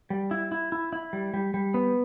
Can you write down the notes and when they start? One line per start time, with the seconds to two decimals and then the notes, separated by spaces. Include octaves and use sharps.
0.10 G3
0.31 E4
0.52 E4
0.72 E4
0.93 E4
1.13 G3
1.34 G3
1.54 G3
1.74 B3